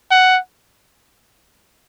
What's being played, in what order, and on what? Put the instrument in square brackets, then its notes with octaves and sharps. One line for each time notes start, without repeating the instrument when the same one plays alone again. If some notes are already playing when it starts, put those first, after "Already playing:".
[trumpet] F#5